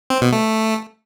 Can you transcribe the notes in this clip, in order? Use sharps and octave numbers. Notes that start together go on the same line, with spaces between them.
C4
B2
A3